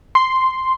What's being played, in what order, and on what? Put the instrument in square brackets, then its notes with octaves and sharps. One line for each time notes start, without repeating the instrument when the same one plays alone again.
[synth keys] C6